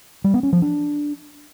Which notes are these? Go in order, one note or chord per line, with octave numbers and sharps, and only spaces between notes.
G3
B3
C#4
F3
D4